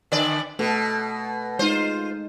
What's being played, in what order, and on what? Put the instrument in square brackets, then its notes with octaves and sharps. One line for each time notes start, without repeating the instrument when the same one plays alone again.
[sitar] D3 D5
[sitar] B2 [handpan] A3 A4
[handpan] G#3 D#4 [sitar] F4 C5